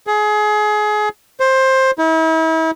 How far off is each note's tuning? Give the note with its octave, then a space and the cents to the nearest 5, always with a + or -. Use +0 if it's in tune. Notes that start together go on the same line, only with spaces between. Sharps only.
G#4 +25
C5 +15
E4 -40